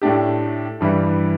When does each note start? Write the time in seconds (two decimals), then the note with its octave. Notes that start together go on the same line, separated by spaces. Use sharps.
0.02 A2 A3 D4 G4
0.81 G2 E3 G3 E4